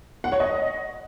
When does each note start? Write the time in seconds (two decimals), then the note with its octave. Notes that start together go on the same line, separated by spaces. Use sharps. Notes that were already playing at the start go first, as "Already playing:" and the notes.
0.24 F#5
0.32 C#5
0.40 D#5